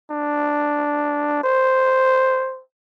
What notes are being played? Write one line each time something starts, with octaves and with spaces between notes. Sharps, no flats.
D4
C5